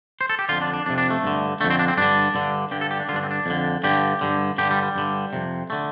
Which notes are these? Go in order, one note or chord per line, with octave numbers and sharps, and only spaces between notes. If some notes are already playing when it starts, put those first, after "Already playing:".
C5
A4
G4
F2 D3 F4
D4
D4
F2 C3 D4
D4
A3
G2 D3
F2 D3 A3
C4
D4
C4
G2 D3 D4
G2 D3
G2 D3 G4
A4
G4
D4
G2 D3 D4 F4
C4
D4
F2 D3
G2 D3 G4
G2 D3
G2 D3 G4
G3
G3
G2 D3
F2 C3
D3 A3